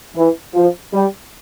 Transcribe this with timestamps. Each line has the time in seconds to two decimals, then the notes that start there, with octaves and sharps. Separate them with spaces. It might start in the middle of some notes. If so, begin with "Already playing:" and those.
0.16 E3
0.54 F3
0.92 G3